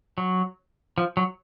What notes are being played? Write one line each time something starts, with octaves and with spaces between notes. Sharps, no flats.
F#3
F3
F#3